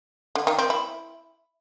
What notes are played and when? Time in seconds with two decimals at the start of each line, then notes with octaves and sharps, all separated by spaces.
0.35 D3
0.47 D#3
0.58 C4
0.70 E4